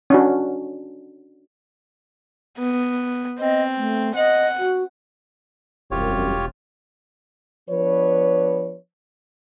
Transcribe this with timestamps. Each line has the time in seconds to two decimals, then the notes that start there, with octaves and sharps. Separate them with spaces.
0.10 C#4 D4 F#4
2.59 B3
3.39 C4 D#5
3.78 A3
4.16 D#5 F#5
4.59 F#4
5.91 E1 C2 F#2 F4 G4 C#5
7.70 F3 B3 D4 B4 C#5